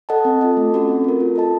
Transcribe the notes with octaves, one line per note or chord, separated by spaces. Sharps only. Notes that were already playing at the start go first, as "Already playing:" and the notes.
A4 D#5 F#5 A5
C4
F4 A4 D#5
A3
C#4 F#4 A4
C4
F4 A#4
F4
A4 D#5 A5